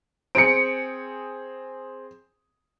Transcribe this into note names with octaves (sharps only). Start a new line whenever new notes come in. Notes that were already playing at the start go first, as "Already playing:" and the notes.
C4 G#4 C#7 D7